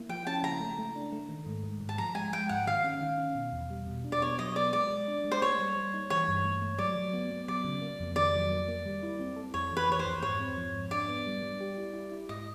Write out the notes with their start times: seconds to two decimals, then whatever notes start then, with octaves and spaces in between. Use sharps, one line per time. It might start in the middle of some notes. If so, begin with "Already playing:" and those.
Already playing: A#3 E4
0.09 F3 G5
0.27 C#4 A5
0.43 C#3 A#5
0.60 A3
0.78 A3
0.96 D4
1.12 A3
1.29 D#3
1.46 G#2
1.64 G#2
1.81 G#2
1.89 A5
1.98 F3 A#5
2.15 G#3 G#5
2.33 G#3 G5
2.49 G#2 F#5
2.66 D#3 F5
2.84 C#4
3.01 D#3
3.18 C#4
3.35 B2
3.53 E2
3.70 G3
3.87 B2
4.04 D4
4.12 D5
4.21 B3 C#5
4.38 F#3 D#5
4.55 B3 D5
4.73 G#3 D5
4.91 G#3
5.08 D4
5.24 G#3
5.32 C5
5.42 A#3 C#5
5.59 G3
5.76 G3
5.94 D#4
6.10 E3 C#5
6.28 G2
6.45 A3
6.62 A3
6.78 F#3 D5
6.96 F#3
7.13 B3
7.31 B3
7.48 F#3 D5
7.64 C#3
7.82 A#3
8.00 F2
8.16 D#3 D5
8.33 F#3
8.51 A#3
8.68 A#3
8.86 G3
9.03 E4
9.20 C4
9.36 A4
9.54 F2 C#5
9.71 E3
9.77 B4
9.89 E3 C#5
9.99 C5
10.05 F2
10.22 G#2 C#5
10.40 C4
10.57 F3
10.74 G#2
10.91 D4 D5
11.08 B3
11.26 G3
11.43 G3
11.60 G4
11.78 E4
11.94 E4
12.12 E4
12.29 G#2 D#5